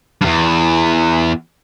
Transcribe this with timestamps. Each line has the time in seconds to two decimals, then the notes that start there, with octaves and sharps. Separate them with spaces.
0.21 E2 G2